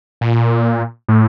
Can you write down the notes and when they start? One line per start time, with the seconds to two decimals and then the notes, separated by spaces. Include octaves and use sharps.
0.21 A#2
1.08 A2